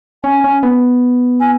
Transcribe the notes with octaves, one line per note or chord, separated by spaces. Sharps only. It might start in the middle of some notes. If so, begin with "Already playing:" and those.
C#4 G#5
C#4
B3
G#5